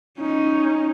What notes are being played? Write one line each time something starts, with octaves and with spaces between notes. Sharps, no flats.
C#4 D#4